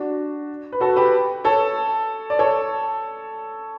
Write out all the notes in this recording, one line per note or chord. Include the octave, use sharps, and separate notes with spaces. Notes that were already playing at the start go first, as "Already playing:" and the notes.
Already playing: D4 F#4
B4
F#4 A4
G4 B4
A4 C#5
D5
A4 C#5